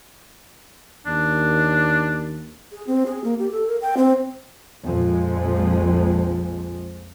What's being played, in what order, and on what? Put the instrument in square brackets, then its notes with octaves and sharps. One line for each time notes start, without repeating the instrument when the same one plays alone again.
[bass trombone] D#2 [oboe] D4
[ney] G#4
C4
G#4
A#3
G4
A4
A#4
G5
C4
[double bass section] A#1 F2 F3 G#3